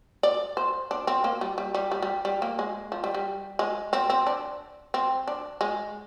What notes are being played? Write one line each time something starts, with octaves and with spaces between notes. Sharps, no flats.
D5
C5
D4
C4
A#3
G3
G3
G3
G3
G3
G3
A#3
G#3
F3
G3
G3
G#3
C4
C4
D4
C4
D4
G#3